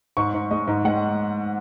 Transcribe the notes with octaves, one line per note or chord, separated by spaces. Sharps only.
G#2 C#6
G#2
G#3 D#5
G#2
G#3 F#5